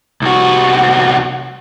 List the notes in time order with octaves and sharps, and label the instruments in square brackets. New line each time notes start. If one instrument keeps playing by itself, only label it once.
[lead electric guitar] C2 F#4